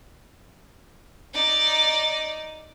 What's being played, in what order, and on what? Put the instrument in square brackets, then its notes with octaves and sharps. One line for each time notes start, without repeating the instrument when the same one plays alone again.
[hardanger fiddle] D#4 D5